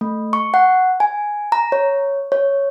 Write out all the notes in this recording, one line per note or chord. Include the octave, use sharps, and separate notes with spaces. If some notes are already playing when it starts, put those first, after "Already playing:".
A3
C#6
F#5
G#5
A#5
C#5
C#5